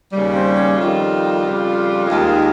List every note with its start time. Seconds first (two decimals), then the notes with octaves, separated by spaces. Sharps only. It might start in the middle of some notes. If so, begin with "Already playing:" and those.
0.13 D#2 C#3 G3
0.35 C4
0.56 C#4
0.77 F2 D#3 G3 F4
1.42 F2 C#3 G3
2.07 D#2 D#3 G#3